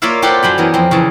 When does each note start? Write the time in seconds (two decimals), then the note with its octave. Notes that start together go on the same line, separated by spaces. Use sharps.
0.02 A#3 F4 C#5 D5 E5 F5
0.22 F4 G4 A4 C5 D5 F#5
0.43 F#2 F#3 G5 B5
0.58 E3 B3 A#4
0.74 F2 C4
0.91 C#3 E3 A5